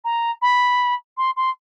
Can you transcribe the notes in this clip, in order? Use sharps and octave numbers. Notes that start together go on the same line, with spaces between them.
A#5
B5
C6
C6